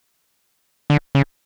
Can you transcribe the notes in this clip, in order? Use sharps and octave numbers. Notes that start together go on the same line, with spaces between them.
D3
C#3